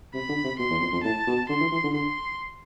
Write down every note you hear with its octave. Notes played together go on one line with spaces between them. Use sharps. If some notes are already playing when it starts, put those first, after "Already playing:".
C3 B5
D3
C3
B2 C6
E2
F2
F2
A2 A5
B2
D3 C6
E3
E3
D3
D3 C6